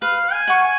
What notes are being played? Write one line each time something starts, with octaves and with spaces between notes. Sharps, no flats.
B4 F5
G#5
F#5 C#6
G#5